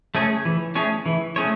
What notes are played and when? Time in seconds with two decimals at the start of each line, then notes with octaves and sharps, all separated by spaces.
0.15 A3 C#4 G#4 C#5
0.45 E3
0.75 A3 C#4 G#4 C#5
1.06 E3
1.36 A3 C#4 G#4 C#5